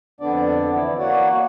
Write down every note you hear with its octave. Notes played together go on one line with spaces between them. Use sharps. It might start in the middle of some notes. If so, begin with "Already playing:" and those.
F2 D3 B3 D4 D5
E3 E4
A#3 F#4 C#5 D5 F#5